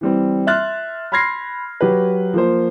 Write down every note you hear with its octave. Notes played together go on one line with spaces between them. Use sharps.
E3 G3 C4
E5 C6 F6 F#6 A6
B5 C6 F6 G#6 A#6 C7
F#3 G4 B4
F3 A#3 C5